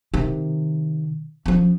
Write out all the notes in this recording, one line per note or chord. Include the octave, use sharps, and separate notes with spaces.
C3 D#3
F3 C#4